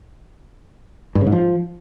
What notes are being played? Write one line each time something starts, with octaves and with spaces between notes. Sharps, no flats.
G2
C#3
G#2
F3